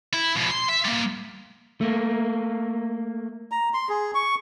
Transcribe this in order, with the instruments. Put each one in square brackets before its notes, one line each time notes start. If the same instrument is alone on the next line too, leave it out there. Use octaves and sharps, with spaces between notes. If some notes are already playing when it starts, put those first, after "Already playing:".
[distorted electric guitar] E4
F2 B2
C6
E5
G3 A#3
[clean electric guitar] A3 A#3
[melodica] A#5
C6
G#4
C#6